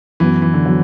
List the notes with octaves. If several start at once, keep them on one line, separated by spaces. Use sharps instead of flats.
F#2 E3 F#3 B3
E3
D3
F#3 B3